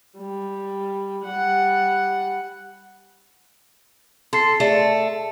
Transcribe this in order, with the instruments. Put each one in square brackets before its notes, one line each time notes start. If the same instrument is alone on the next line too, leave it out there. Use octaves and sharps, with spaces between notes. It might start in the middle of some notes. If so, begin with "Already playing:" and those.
[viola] G3
G3 F#5
[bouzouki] A4 [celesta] C6 C7
[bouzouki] A3 [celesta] G#4 D5